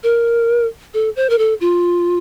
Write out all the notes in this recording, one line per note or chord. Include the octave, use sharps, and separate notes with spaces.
A#4
A4
C5
A#4
A4
F4